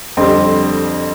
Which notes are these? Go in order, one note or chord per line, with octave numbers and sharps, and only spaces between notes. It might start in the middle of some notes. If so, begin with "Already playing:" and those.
F2 D3 G3 C4